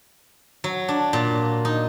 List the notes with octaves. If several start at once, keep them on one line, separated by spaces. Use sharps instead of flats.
F#3
D4
A#2
D#4